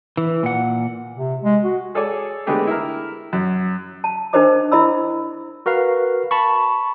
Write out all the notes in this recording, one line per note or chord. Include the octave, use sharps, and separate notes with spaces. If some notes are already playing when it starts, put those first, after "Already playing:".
E3
A#2 F#5
C3
G#3
F#4
G#4 A4 C#5 D5 G#5
D3 G#3 A3 B3 G4 G#4
E4 A#4
F#2
A5
D4 D#4 A#4 C5 D#5 D6
E4 D#5 B5 E6
F#4 A#4 B4 F5
A5 B5 C#6